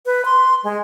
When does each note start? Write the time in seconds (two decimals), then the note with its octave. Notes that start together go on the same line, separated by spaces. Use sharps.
0.06 B4
0.25 C6
0.64 G#3